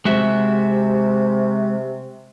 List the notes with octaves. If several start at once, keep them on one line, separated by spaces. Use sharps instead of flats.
C3 G#3 F#4 E5